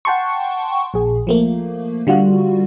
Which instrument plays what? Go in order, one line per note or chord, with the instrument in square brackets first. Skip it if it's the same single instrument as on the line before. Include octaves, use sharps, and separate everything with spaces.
[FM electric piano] F#5 G5 A5 C6 C#6
A#1 G#4
F3 A3 A#3
D3 G3 F4 F#4